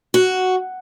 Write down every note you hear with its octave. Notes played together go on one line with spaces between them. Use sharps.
F#4